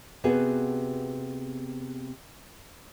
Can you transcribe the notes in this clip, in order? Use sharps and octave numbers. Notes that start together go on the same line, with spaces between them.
C3 B3 F#4 G#4